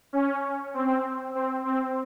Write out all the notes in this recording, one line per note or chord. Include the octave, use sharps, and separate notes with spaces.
C#4
C4
C4
C4